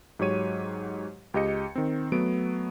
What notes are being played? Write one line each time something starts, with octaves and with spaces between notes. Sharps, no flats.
G#2 F#3 G4 C#5 D#7
C#2 G4 D#5 C#7
D#3 C4
F#3 A3 B3 D7